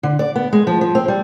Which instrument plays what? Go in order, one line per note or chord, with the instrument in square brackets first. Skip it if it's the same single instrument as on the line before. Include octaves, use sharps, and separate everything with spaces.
[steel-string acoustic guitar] D3
D5
B3
G#3
F3
F3
C4
G3